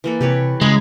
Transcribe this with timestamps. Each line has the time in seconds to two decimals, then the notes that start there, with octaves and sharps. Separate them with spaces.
0.04 E3 A#3 A4
0.21 C3 G4 B4 C#5
0.61 C#3 G#3 G#5 A#5 B5